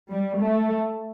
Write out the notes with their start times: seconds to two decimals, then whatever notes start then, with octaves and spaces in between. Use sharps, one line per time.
0.10 G3
0.40 A3